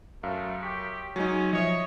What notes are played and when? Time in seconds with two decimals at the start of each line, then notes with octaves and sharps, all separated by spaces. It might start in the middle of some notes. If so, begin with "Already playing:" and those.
0.23 F#2 A3 F5
0.63 G4 C#6 B6
1.16 F#3 G#3 C#4 D#4
1.53 F3 C#5 D#5 E5 D#6